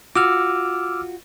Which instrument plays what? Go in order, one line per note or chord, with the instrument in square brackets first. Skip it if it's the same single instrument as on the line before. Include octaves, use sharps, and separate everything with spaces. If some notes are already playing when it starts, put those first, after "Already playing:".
[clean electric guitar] F4 F#4 [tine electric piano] D6 E6 F6